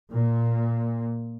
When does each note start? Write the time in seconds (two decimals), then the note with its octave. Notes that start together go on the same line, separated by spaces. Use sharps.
0.12 A#2